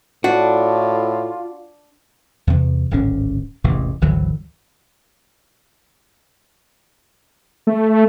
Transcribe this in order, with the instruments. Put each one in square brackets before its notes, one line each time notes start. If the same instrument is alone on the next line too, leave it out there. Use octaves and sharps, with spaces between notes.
[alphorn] A2 [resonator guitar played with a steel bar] D4 [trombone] F4 [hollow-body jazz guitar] F#4
[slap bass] E2 C3
D1 G#1 D3 C#4
E1 A1 C3 E3
G#1 D2 E3 F#3
[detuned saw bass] A3